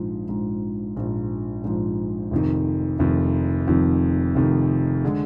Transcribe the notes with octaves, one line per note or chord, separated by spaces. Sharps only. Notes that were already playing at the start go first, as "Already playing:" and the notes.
Already playing: A#1 G#2 F3
A#1 G#2 F3
A#1 G#2 F3
A#1 G#2 F3
F1 F2 D#3
F1 F2 D#3
F1 F2 D#3
F1 F2 D#3
D3 G#3